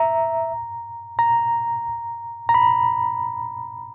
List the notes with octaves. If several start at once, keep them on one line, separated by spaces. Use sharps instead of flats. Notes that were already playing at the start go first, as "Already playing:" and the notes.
Already playing: E5 A#5
A#5
A#5
B5